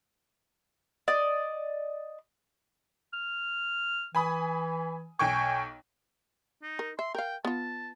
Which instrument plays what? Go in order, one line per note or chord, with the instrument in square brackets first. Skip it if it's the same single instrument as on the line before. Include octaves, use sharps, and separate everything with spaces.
[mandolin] D5 D#5
[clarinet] F6
[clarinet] E3 [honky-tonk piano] G#5 B5 D#6
[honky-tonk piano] B1 G5 C#6 [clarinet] G#5
[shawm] D#4
[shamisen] A#4
[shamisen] E5 [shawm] C6
[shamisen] A#4 F5 [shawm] G5
[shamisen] B3 F4 [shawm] A5